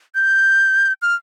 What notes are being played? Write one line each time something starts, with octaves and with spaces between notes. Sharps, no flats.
G6
F6